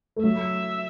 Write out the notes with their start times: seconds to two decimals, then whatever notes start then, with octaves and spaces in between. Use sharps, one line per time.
0.16 A3
0.23 F#3 E5